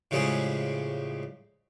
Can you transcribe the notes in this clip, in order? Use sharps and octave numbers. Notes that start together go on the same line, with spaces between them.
A2 C#3 F3 G3 G#3 G#4